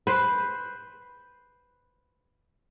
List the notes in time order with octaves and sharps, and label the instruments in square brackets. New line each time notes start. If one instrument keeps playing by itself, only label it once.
[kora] B4 C5